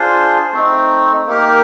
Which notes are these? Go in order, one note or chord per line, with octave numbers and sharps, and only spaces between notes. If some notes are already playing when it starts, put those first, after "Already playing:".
Already playing: D4 F4 G#4 C5
A3 C4 D#4
A#3 D#4 G4 A#4